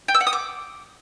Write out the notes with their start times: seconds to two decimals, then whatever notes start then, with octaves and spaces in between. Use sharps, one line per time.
0.08 G5
0.14 E6
0.21 F#5
0.27 D#6
0.33 D6